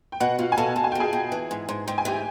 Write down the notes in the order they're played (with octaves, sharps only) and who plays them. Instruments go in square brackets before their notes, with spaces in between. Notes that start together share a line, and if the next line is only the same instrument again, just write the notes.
[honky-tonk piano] G5
[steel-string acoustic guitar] B2 [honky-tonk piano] F#4 F#5
[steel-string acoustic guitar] B2 [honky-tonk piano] F4 F5
[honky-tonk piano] G#5
[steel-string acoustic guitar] B2 [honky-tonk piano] A4 A5
[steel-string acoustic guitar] B2 [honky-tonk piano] A5
[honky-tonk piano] G#5
G5
[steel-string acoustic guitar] B2 [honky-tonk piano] G#4 G#5
[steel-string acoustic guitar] B2
E3
G#2
G#2
[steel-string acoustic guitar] G#2 [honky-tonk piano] G5
[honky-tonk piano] G#5
[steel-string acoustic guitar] E3 [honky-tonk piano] G4 G5